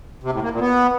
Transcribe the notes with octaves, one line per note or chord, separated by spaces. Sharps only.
C3
A2
A#3
A#2
B3